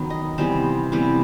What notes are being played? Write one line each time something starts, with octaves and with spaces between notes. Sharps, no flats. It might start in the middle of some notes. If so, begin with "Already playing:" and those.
Already playing: D#3 F#3 B3
D#5
C3 E3 G3 B3 C5
C3 E3 G3 B3